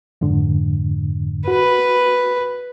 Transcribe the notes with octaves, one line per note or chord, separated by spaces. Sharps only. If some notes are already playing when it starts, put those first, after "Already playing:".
F2 G#2 D3
F#4 B4